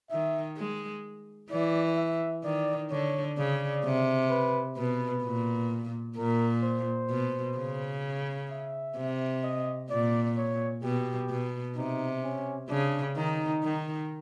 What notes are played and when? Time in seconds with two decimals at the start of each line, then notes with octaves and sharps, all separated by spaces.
0.11 D#3 E5
0.57 G#3
1.51 E3 D5
1.97 E5
2.44 D#3 D5
2.91 D3 C#5
3.37 C#3 D5
3.85 C3
4.30 B4
4.77 B2 B4
5.24 A#2
6.17 A#2 A#4
6.63 C5
7.10 B2
7.57 C#3
8.50 E5
8.97 C3
9.44 D#5
9.90 A#2 D5
10.37 C#5
10.83 B2 G4
11.30 B2
11.76 C3 D#4
12.24 C#4
12.70 C#3 D4
13.17 D#3 D#4
13.63 D#3